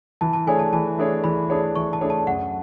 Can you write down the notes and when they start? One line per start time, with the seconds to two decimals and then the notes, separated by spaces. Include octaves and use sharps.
0.21 E3 A5
0.33 A5
0.47 A3 D4 G#4 C#5 G#5
0.59 A5
0.73 E3 A5
0.98 A3 D4 G#4 C#5
1.24 E3 B5
1.50 A3 D4 G#4 C#5
1.76 E3 C#6
1.93 A5
2.01 A3 D4 G#4 C#5
2.10 A5
2.27 F#2 F#5